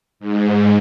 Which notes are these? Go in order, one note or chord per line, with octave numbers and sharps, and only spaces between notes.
G#2